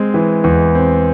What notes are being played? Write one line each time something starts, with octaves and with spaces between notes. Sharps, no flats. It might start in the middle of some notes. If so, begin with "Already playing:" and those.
Already playing: G#3 C4
E3
E2
C4